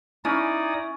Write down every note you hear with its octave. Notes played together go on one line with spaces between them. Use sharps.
C#4 D#4 E4 D5 D#6